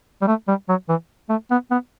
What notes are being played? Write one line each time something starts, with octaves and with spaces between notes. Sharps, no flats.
G3
A3
G3
F#3
E3
A3
B3
B3